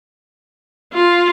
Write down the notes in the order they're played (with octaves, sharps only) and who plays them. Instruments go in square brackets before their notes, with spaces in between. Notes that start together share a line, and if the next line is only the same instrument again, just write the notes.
[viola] F4